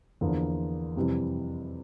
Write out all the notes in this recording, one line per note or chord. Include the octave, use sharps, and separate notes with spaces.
E2 D3 F3 A#3
F2 C3 E3 G3